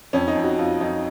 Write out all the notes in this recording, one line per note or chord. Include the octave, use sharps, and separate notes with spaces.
F2 C#4
D#4
F2
F#4
F2 F4
F2 D#4